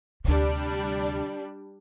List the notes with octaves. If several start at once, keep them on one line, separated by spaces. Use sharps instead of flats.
D2 C3 G3 D4